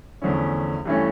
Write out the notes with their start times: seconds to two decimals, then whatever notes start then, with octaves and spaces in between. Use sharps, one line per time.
0.22 E2 D3 F3 A3 C#4
0.85 G2 E3 A3 C#4